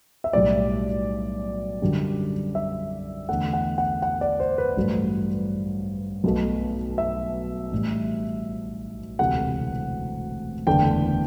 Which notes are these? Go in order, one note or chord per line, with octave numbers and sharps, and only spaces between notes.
E5
B1 A2 G3 D5
F#2 D3 G3
E5
E2 D3 A3 F#5
F#5
F#5
F#5
D5
C5
B4
A1 G2 F#3 A3
B1 B2 A3
E5
A1 A2 G3
E1 D2 C3 E3 A3 F#5
F#1 E2 D3 A3 G5